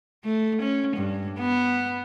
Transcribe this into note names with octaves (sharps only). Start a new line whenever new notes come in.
A3
C#4
G2
B3